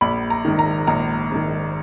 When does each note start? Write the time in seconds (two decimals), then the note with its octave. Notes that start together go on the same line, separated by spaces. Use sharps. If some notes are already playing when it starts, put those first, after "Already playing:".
0.01 A#1 B5
0.30 A#5
0.45 G#2 D#3
0.59 A#5
0.87 A#1 A#5
1.32 G#2 D#3